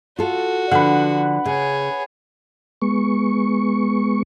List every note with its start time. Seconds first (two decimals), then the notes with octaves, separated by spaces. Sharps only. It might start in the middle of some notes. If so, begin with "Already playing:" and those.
0.19 F4 F#4 A4
0.71 D3 F3 B4 F#5
1.45 C#3 G#4 C#5
2.82 G#3 B3 C#6